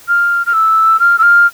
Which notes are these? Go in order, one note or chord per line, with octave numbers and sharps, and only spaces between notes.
F6
F6
E6
F6
E6
F6